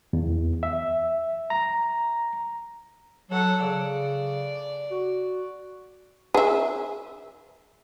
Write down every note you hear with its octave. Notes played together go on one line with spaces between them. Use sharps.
E2
E5
A#5
F#3 A4 F#5
C#3 D5
F#4
G#4 E5